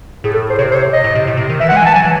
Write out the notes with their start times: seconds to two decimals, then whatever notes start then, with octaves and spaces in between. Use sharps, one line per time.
0.24 A2 G#4
0.34 A4
0.50 C5
0.58 C3 C#5
0.71 C5
0.76 C#5
0.93 D#5
1.04 A2
1.15 C3
1.27 A2
1.37 C3
1.50 D#3
1.60 E3 E5
1.69 F#5
1.72 G#3
1.77 G#5
1.83 E3 A5
1.94 F#3 G#5
2.05 E3